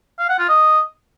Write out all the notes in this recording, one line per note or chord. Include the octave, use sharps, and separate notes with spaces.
F5
F#5
F4
D#5